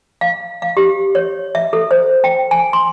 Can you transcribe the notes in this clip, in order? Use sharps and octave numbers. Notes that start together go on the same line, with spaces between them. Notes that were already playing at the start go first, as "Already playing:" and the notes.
F5
F5
G4
C#5
E5
A4
C5
G5
G#5
C6